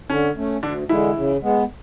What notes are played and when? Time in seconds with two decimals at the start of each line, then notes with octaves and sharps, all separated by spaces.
0.10 D3 C#4
0.36 A3 C#4
0.63 D2 D3 D4
0.89 D3 E3 G#3 E4
1.16 C#3
1.42 G#3 B3